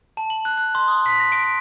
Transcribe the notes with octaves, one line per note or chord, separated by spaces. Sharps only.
A5
F#7
F#6
F#6
C6
D#6
B6
A#6
D7
D7